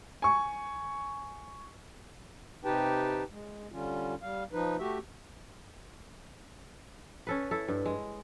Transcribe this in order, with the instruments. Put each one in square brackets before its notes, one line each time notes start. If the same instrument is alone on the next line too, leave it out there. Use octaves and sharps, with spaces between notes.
[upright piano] G#5 C#6
[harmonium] C3 D#4 G4 B4 G5 A5
G#3
D3 G3 C#4 F4
G3 F5
F3 D#4 B4
A3 F#4 G4 E5
[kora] C#4 A4 B4
E4 A4
G2
G#3